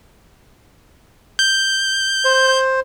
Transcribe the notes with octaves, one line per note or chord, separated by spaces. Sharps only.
G6
C5